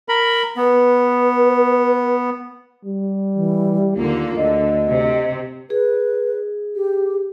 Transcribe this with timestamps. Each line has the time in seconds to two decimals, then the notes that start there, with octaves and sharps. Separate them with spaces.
0.09 A#4 B5
0.57 B3 B4
2.85 G3
3.35 E3
3.97 D#2 D3 A#3 F4
4.37 D2 D3 D#5
4.92 C3
5.70 G#4 B4
6.76 G4